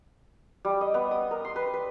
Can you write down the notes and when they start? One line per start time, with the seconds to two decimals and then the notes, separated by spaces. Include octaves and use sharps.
0.65 G3
0.81 D#5
0.94 B3
1.11 D#6
1.31 A#4
1.45 C6
1.56 B4
1.74 B4